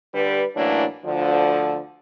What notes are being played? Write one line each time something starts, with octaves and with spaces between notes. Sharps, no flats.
D3 G3 G4 B4
A2 E3 F#3 A#3 C#4 D4
D2 D3 F3